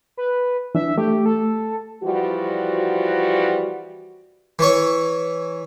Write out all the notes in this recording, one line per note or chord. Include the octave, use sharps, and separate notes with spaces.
B4
E3 D4 E5
A3 G4
A4
E3 F3 G3 F#4
E3 C#5